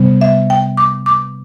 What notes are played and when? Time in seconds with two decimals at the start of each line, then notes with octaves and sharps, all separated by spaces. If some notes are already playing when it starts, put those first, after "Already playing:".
Already playing: C3 G3 B3
0.21 E5
0.50 G5
0.77 D6
1.06 D6